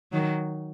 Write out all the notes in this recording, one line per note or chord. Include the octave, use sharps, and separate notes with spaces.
D#3 F#3